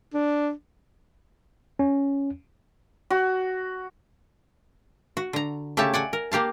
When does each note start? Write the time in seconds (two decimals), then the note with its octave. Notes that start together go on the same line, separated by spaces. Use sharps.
0.14 D4
1.79 C#4
3.10 F#4
5.17 F#4
5.33 D3 A#5
5.77 C#3 A3 G4 C#5 E5 A5
5.94 D5 F#5 G#5
6.13 A#4
6.32 A#3 G4 F5 A5